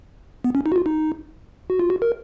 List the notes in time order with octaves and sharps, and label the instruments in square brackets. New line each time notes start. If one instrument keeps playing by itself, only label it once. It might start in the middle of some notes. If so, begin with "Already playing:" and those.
[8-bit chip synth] B3
C#4
D#4
F#4
F4
D#4
F#4
F4
F#4
A#4